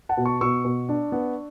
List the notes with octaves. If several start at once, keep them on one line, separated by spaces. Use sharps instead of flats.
F#5 A5
B2
A5 C#6
B2 C#6 E6
B2
D4
B3